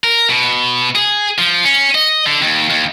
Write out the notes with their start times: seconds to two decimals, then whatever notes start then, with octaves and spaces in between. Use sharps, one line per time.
0.04 A#4
0.29 B2
0.95 G#4
1.38 F3
1.64 C#4
1.95 D#5
2.26 D3
2.42 D#2
2.70 D#2